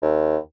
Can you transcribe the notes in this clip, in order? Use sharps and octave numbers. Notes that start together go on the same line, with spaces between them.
D#2